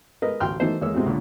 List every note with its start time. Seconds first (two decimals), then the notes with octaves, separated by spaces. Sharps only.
0.22 G#3 A#4 B4 D#5
0.40 A1 D2 G5 C6 F6
0.60 D#3 E3 F#3 A3 D#4 C5
0.81 E2 G#3 A#3 C#5 E6
0.94 C3 G#3 C4 E4 F#4
1.06 C#2 A#2 D3